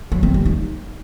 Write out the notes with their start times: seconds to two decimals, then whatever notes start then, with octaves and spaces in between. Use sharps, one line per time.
0.12 F#3
0.23 C4
0.34 G3
0.46 D#4